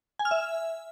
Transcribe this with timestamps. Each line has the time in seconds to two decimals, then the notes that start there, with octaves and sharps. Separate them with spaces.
0.19 G#5
0.25 F6
0.31 E5